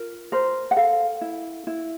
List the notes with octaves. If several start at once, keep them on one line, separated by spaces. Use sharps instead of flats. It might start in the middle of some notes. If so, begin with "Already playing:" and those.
Already playing: F4 A#4
A#4 C5
F#5
A4 F5
E4
E4